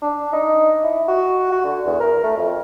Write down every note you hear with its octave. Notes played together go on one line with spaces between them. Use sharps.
D4
D#4
E4
F#4
F#4
D3
E2
A#4
A3
F2